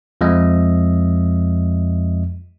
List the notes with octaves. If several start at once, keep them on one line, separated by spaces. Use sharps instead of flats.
F2 F3 G#3 D#5 E5